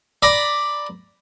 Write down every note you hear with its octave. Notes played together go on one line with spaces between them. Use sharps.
D5 A#5 B5